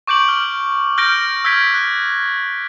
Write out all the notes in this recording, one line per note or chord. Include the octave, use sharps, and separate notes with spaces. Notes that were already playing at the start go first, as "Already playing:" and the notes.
C#6 D6 G6 D7 F#7
F6
F6 G6 A#6 D7
E6 F6 G6 G#6 B6 D7
F#6